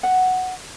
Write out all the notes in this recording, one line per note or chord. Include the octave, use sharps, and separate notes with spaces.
F#5